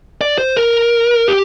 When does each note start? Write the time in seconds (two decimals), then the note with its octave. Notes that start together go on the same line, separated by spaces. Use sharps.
0.21 D5
0.38 C5
0.57 A#4
1.28 G4